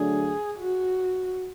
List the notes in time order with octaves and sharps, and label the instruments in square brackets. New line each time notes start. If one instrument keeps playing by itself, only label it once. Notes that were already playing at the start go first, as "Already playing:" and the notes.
Already playing: [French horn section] D3 F#3 A3 D4 [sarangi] G#4
[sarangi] F#4